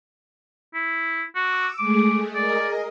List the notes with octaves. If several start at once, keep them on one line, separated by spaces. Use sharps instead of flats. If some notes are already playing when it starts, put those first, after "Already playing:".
E4
F#4 D6 E6
G#3 A3 G#4 D6
G#4 A#4 D5 D#5